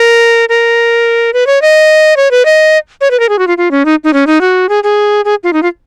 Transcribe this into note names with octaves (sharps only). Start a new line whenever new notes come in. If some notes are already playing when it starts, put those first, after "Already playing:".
Already playing: A#4
A#4
B4
C#5
D#5
C#5
B4
D#5
C#5
B4
A#4
G#4
F#4
F4
F4
C#4
D#4
D#4
C#4
D#4
F#4
G#4
G#4
G#4
F4
D#4
F4